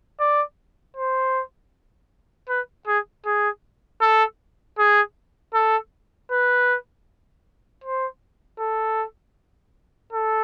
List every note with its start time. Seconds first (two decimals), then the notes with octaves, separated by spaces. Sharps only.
0.20 D5
0.97 C5
2.49 B4
2.87 G#4
3.26 G#4
4.01 A4
4.78 G#4
5.54 A4
6.31 B4
7.84 C5
8.60 A4
10.13 A4